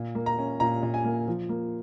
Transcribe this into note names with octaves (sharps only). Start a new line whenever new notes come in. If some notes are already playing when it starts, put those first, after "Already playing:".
Already playing: A#2
A#3
A#5
C#4
A#2 A#5
A#2
G#5
A#3
F3
A#3